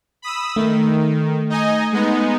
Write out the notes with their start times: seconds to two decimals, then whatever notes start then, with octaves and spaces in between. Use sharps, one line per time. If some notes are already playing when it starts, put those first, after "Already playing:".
0.22 B5 D#6 E6
0.56 D#3 A3
1.50 D#4 D#5 G#5
1.92 G#3 B3 D#4